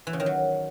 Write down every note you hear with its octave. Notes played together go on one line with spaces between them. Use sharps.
E3
C#3
D#3
F#3